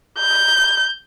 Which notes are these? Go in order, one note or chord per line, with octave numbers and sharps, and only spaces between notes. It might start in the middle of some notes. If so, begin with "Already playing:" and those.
G6